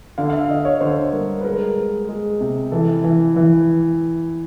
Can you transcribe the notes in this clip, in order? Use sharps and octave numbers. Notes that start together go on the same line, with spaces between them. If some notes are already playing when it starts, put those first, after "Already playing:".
D3 F5
F5
E5
D3 D#5
C#5
D3 C5
G3 A#4
B4
G#3 A#4
G#3
G#3
C3
E3 A4
E3
E3